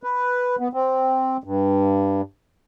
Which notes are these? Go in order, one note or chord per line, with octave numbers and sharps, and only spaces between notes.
B4
B3
C4
G2